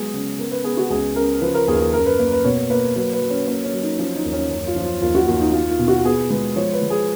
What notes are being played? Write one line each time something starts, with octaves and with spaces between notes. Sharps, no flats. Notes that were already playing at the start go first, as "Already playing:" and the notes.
Already playing: F#3 G#3 B3 G#4
C#3
B3 A#4
B4
B3 G#4
F#4
C#2 G#4
C#3 A#4
F3 B4
A#4
D#2 G#4
A#4
G#4
F#2 A#4
B4
A#3 B4
B4
B2 C#5
A#3 B4
F#3 B4
B4
F#3
C#4
A#3 C#4
C#4
F#3
D#4
F3 C#4
D#4
D#2
C#4
F#2 C#4
F4
F3
F4
D#2 F4
F#4
D#2 F4
D#4
A#3 F4
F4
B2
F#4
B3 G#4
G#3 B4
F3 C#5
B4
G#3
G#4